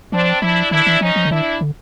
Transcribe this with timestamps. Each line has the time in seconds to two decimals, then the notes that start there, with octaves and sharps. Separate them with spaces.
0.12 F3 C4 D4
0.42 F3 D4 E4
0.71 D#3 D4 E4
0.87 E3
1.01 F3 C#4 D#4
1.16 F3
1.25 D3
1.31 D#3 D4 E4
1.61 D3